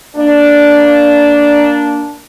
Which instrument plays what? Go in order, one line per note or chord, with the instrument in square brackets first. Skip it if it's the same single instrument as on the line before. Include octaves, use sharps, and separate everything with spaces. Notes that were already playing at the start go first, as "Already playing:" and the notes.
[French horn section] A#3 D4